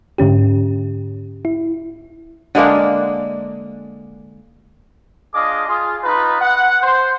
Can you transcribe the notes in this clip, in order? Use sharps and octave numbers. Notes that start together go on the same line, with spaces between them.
G#2 D3 C#4 G4
E4
D3 G#3 A#3 D4
D4 F4 G#4 D#5 F5 D6
F4 G#4
D#4 F4 B4
F#5
C5